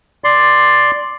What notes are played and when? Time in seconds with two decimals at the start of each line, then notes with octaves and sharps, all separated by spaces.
0.24 D5 C6